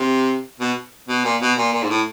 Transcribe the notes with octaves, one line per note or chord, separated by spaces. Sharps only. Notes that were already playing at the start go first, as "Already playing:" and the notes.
Already playing: C3
B2
B2
A#2
B2
A#2
A#2
G#2
A2